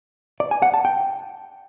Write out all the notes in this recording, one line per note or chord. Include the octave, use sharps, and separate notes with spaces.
D5
G#5
F#5
A5
G5